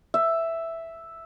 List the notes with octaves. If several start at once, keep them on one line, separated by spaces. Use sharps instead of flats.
E5